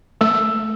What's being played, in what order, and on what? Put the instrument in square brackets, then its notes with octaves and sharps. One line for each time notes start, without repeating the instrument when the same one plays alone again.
[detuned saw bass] A3 [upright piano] E6